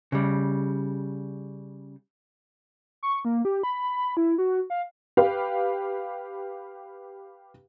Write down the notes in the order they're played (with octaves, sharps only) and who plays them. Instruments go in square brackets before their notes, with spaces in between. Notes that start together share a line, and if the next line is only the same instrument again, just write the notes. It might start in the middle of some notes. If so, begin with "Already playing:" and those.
[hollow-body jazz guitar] C#3 G3
[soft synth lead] C#6
A#3
G4
B5
E4
F#4
F5
[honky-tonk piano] G4 B4 F5